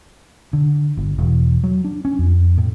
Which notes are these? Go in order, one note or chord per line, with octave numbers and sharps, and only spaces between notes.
D3
G1
E1
F#3
D4
C#4
F2
A2